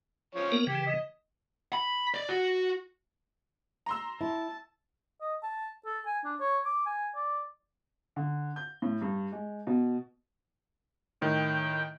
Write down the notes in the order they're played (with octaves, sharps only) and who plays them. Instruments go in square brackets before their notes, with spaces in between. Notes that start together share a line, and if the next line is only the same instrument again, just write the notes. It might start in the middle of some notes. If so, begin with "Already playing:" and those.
[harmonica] F3 C#4 C#5
[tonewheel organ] A#3 B3 A#4
[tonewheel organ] C#3 E3 [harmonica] G4
[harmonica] D#5
[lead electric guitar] B5
D5
F#4
[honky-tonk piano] A#5 C6 E6
[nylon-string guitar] E4 [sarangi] A5
[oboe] D#5
A5
A4
G#5
D4
C#5
D6
G#5
D5
[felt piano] D3
G6
A2
G2
G#3
B2
[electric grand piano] A2 D#3 [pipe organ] G5